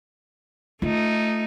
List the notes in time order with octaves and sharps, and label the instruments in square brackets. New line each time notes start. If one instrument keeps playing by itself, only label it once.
[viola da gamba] A3 D#4 [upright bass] F4